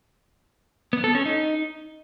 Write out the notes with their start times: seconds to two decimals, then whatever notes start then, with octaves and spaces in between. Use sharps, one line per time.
0.93 B3
1.04 A4
1.15 C#4
1.26 D#4